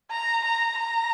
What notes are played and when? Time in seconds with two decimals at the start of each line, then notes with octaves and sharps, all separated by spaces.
0.11 A#5
0.45 A#5
0.78 A#5